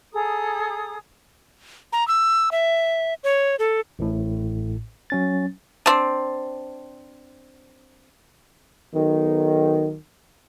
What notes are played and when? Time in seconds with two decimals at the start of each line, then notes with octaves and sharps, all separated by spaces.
0.14 G#4 A4 A#5 D#6
1.93 A#5
2.08 E6
2.52 E5
3.24 C#5
3.59 A4
3.99 A1 A2
5.10 F#3 C#4 A6
5.86 C4 D4
8.94 B1 D#3